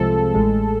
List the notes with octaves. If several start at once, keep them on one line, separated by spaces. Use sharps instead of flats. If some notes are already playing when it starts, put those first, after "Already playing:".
Already playing: C2 C3 F3 G#3 C4 A4
A1 A2 G#3